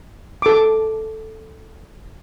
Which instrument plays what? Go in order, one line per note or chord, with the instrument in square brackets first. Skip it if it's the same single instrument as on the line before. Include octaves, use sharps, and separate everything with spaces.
[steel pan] A4 D6